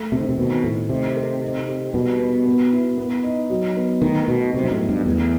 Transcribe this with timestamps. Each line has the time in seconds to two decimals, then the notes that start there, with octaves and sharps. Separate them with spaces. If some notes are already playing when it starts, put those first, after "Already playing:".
Already playing: A3
0.12 C3 C4
0.20 D#3
0.29 C3
0.38 B2 D#3
0.64 A2 A3
0.89 C3 D#4
1.16 A4
1.42 D#4
1.68 G4
1.93 B2 G3
2.19 B3
2.46 B3
2.72 E4
2.98 B3
3.23 D#4
3.50 F#3
3.76 B3
4.02 D#3 A3
4.28 B2 D#4
4.53 C3 F#3
4.64 G2
4.71 A2
4.79 B3
4.89 G2
5.05 E2 A3